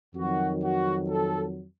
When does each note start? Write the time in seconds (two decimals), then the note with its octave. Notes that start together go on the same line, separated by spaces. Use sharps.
0.15 F2 D#3 F#3 F#4
0.62 F#4
1.09 A4